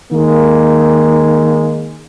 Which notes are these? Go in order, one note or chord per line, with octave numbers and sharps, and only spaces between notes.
D#3 G#3 A#3